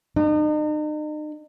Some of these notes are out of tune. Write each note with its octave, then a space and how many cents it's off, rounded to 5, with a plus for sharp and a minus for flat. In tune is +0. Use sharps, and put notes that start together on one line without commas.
D#4 -40